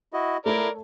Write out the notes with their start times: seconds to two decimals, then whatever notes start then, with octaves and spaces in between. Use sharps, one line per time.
0.13 E4 F#4 D#5
0.46 A3 E4 A4 A#4 C#5 D5